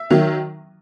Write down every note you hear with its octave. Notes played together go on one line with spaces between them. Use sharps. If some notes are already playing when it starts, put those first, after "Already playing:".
Already playing: E5
D#3 F#3